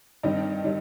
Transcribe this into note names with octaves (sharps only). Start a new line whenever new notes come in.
G2 D#3 G3 C4 D#5 G5
D#3 G3